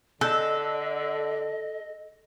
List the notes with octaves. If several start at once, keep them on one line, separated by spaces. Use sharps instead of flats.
D3 A4 D#5 E6 F#6 G6